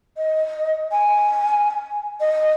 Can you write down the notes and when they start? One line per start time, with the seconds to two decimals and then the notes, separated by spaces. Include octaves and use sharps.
0.17 D#5
0.91 G#5
2.20 D#5